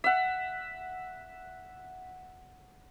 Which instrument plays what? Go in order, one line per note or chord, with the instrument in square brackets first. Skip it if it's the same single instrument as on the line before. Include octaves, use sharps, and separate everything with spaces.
[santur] E5 F#5